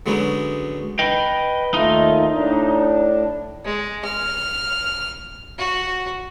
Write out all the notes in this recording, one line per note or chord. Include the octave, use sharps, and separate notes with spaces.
D3 F#3 G#3 B3 C#4 D#4
B4 D#5 G5
D#2 A3 D#4 F4
A2 D4
G#3
F6
F#4